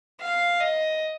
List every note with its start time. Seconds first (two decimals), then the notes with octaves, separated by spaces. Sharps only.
0.21 F5
0.60 D#5